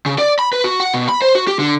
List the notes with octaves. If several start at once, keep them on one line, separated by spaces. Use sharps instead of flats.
C#3
D5
B5
B4
F#4
F#5
B2
B5
C5
F#4
G4
D3